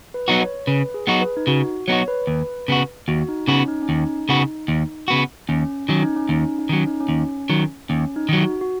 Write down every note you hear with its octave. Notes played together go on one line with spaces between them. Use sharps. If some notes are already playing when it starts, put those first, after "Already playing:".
B4
F#3 B3 D#4 F#4
C#5
C#3 B4
G#4
F#3 B3 D#4 F#4
B4
D#4
C#3 F#4
F#3 B3 D#4 F#4 C#5
B4
D#2
C#3 B3 F#4
D#2 F#4
D#4
C#3 B3 C#4 F#4
D#4
C#4
D#2
D#4
C#3 B3 F#4
D#2
C#3 B3 F#4
D#2 C#4
D#3 F#3 C#4
D#4
C#4
D#2 D#4
C#4
D#4
D#3 F#3 C#4
D#4
C#4
D#2
D#3 F#3
D#2 C#4
D#4
D#3 F#3
F#4
F#4